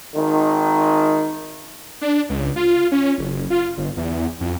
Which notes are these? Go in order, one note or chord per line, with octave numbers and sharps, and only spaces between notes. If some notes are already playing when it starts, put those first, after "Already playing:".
G#1 D#3
D4
C#2
F4
C#4
F#1
F4
G1
E2
F2